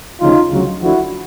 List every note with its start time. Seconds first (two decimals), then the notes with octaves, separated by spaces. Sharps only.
0.20 D2 C#3 F3 D#4 F4
0.51 D2 C#3 F#3
0.81 D2 D3 F3 E4 F#4